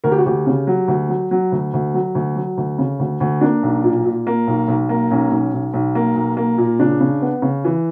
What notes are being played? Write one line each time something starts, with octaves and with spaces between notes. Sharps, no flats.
D2 A#4
G4
F#4
D2 G4
C#3
F#3
D2
F#3
F#3
D2
D2
F#3
D2
F#3
D2
C#3
D2
D2
A#3 D4
B1
A#2
A#2
A#3
B1
B1
A#3
B1 C#4
B1
B1
B1
A#3
B1
A#3
A#2
C#3 D4
C#3
B3
C#3
E3